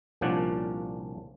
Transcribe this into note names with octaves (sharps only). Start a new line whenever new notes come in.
C2 A#2 F3 C#4 D4 F#5